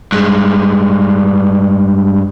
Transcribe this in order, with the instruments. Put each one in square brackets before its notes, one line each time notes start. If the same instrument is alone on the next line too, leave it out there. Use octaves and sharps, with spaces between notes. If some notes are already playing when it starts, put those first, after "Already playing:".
[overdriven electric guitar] G2 G#3